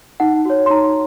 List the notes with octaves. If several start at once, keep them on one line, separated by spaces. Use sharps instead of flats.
D#4 F#5
F#4 C#5
C6
D#4 A#5